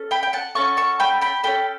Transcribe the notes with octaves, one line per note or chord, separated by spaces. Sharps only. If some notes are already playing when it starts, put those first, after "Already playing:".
Already playing: C#4 A4
G5 B5
G5
F#5 A5
C#4 F#4 A4 A5 C#6
A5 C#6
G5 B5
G5 B5
C#4 F#4 A4 G5 B5